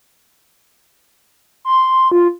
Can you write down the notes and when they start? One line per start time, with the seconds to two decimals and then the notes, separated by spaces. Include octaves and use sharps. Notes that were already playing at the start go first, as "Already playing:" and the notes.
1.65 C6
2.12 F4